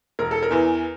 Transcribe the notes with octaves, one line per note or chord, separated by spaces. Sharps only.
E1 A#4
A4
A#4
E2 E3